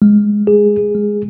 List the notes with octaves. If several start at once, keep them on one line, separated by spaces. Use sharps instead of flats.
G#3
G#4
G#3